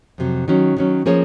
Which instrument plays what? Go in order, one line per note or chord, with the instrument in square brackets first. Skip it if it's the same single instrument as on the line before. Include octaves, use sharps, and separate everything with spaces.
[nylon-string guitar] F2 C3 F#3
D#3 F#3 C#4
D#3 F#3 C#4
F3 A#3 C#4 G#4 C#5